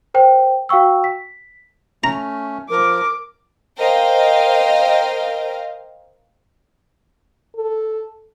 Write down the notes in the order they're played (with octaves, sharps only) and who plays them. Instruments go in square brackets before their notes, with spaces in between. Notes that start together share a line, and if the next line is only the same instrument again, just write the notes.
[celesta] A#4 C5 G5
F#4 F5 G5 C#6 E6
B6
[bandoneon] A3 C#4 [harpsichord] A#5
[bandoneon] F3 [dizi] A#4 [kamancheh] D6
[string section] A#4 C5 D#5 F5 G5
[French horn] A4